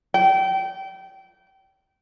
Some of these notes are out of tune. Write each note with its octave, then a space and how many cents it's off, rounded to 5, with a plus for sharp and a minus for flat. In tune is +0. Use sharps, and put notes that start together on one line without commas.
G5 -25